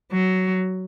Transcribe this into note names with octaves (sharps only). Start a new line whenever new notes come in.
F#3